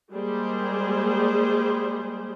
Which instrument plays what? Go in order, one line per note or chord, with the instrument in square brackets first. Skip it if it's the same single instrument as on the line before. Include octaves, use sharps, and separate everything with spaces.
[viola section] G3 G#3 A#3 G4 G#4 C5